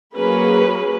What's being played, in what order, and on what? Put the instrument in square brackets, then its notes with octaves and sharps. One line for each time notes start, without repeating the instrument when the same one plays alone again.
[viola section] F#3 A#3 C#4 G#4 B4